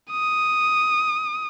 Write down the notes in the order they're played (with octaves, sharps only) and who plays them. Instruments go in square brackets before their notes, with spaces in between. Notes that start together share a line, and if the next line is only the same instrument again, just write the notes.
[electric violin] D#6